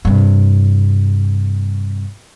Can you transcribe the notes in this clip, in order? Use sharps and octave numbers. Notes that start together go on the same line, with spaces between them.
G2 C3